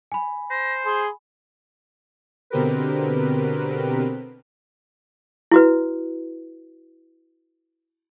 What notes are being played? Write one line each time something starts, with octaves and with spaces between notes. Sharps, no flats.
G#5 B5
C5 A#6
G#4 C6
B2 D3 C4 G4 A#4 B4
E4 F#4 B4